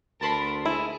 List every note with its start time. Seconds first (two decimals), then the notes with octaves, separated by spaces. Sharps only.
0.21 D2 A#4 A5 B5 C6
0.66 E4 G#4